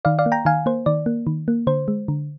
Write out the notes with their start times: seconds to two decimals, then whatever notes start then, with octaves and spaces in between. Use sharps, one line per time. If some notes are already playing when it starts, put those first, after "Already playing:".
0.05 D#3 D5 F5
0.19 D5 F5
0.26 A#3
0.32 G5 A#5
0.45 D#3 F5 G#5
0.66 A#3 C5
0.86 D#3 D5
1.06 A#3
1.27 D#3
1.48 A#3
1.67 D3 C5
1.88 G#3
2.08 D3